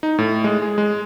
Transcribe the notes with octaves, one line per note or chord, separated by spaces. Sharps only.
D#4
A2
G#3
G#4
G#3